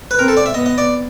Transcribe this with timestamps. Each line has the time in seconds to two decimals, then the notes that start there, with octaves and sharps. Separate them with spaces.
0.11 B4
0.19 C4 A#4
0.28 A4
0.37 D5
0.46 E5
0.54 B3 D#5
0.66 D#5
0.78 D5